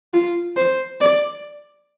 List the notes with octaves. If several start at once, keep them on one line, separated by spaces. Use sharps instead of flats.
F4
C5
D5